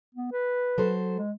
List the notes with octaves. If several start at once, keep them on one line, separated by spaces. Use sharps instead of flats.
B3
B4
F#3 A4 C5
G#3